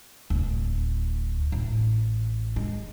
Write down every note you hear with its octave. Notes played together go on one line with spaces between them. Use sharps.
D1
A1
G#3